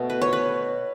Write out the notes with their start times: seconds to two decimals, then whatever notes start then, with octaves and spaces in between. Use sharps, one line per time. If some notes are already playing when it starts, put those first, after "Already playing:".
Already playing: B2 A3
0.10 B4
0.22 C#5
0.33 B4